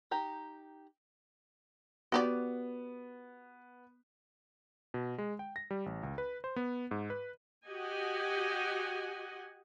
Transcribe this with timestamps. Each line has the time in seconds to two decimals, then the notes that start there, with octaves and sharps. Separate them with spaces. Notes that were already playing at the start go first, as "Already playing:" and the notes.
0.11 D#4 G4 A#5
2.12 B3 F#4 G4 D5
4.94 B2
5.18 G#3
5.39 G5
5.56 A#6
5.71 G3
5.86 A1
6.03 C#2
6.18 B4
6.44 C5
6.56 B3
6.91 G#2
7.10 B4
7.66 F#4 G4 D#5 F#5 G#5